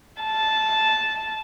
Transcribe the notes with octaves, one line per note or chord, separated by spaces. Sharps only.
A5